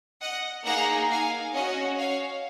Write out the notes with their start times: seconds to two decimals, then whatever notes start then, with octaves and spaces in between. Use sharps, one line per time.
0.21 D#5 F#5
0.66 A#3 D#4 G#4 F#5 A#5
1.10 F5 G#5
1.54 C#4 F#4 D#5 F#5
1.98 C#5 F5